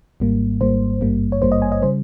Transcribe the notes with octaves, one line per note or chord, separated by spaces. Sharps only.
G#1 G#2 G3 A#3
G#1 G#2 G3 A#3 C5
G#1 G2 G3 A#3
C#5
G#1 G2 G3 A#3 C5
D#5
G#5
D#5
C#3 G3 C5